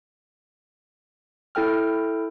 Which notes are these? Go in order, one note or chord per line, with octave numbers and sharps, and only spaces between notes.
E4 A4 G5 F6